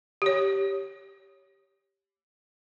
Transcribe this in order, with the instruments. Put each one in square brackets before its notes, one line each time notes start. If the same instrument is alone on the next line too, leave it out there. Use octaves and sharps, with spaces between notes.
[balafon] G4 C#5